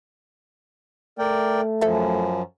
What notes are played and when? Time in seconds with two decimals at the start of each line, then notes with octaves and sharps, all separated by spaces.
1.19 A3 A#4 D5 G5
1.81 F#2 F3 A4 E5 A5